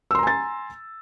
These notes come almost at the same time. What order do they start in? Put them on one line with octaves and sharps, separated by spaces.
E6 C6 A#5 G#5 A6